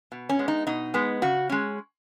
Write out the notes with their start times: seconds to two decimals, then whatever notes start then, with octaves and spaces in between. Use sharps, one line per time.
0.12 B2
0.29 C#4
0.39 G#3 B3
0.48 D#4
0.67 B2 D#4
0.94 G#3 B3
1.22 C#3 F#4
1.49 G#3 C#4